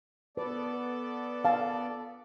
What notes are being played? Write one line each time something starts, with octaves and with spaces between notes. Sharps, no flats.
B3 A4 B4 D5
F5 A5